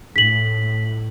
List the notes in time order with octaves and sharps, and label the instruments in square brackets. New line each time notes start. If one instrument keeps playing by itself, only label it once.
[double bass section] A2 [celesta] B6 F#7